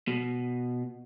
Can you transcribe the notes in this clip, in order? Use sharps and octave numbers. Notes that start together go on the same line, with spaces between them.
B2